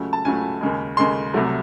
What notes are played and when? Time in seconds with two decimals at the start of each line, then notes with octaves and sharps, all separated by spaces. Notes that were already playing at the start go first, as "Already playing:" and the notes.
Already playing: C#2 C#3 F#3 A3
0.13 A5
0.25 C#2 C#3 F#3 A3 G#5
0.61 D#2 C#3 G#3
0.97 D#2 C#3 G#3 C6
1.34 C2 C3 F#3 A3